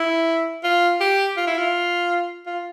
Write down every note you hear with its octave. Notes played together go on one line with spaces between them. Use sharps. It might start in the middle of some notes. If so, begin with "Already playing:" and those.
Already playing: E4
F4
G4
F4
E4
F4
F4